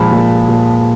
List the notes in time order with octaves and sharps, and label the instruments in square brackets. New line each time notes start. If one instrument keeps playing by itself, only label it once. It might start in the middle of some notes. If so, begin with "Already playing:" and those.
Already playing: [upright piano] A#2 F3 G#3 A5 B5
A#2
A#2